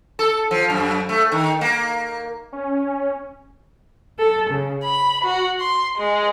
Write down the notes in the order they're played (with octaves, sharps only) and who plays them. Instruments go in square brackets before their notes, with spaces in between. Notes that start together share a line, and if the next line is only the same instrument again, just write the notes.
[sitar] A4
F3
F#2
A3
D#3
A#3
[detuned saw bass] C#4
[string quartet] A4
C#3
B5
F#4
C6
G#3